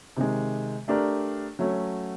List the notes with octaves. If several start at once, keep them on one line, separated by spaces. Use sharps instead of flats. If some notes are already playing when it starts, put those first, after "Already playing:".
C3 D#3 G#3
A3 D4 G4 A#4 D5
F#3 A3 C#4